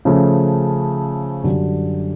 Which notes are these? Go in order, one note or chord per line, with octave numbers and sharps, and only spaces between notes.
C#3 F3 A3 C#4
F#2 D3 G3